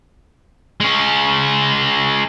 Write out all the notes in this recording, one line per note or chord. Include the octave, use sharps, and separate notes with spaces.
G#3 C#4